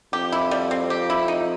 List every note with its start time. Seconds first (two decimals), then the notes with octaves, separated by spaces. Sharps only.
0.13 F2 G4
0.32 E4
0.51 G3
0.71 C4
0.90 G4
1.10 E4
1.28 D#4